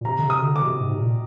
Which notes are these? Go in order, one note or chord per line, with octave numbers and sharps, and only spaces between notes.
A#2
C3 A#5
D3
C3
D#6
D3
D3 D6
C3
G#2
C3
A#2